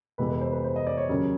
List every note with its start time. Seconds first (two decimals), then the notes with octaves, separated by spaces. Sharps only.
0.18 F2 C3 E3 G#3 B3 B4
0.30 B4
0.41 C5
0.52 B4
0.64 C5
0.76 D#5
0.87 D5
0.97 C#5
1.09 D#2 C#3 F#3